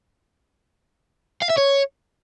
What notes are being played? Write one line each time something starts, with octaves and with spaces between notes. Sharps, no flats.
F5
E5
C#5